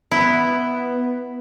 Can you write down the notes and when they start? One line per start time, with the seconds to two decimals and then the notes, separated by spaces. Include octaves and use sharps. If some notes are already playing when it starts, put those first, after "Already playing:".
0.11 B3 E4